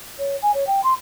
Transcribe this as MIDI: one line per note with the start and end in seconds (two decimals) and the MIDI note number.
0.18 0.36 73
0.42 0.51 80
0.53 0.66 73
0.67 0.83 79
0.83 0.93 84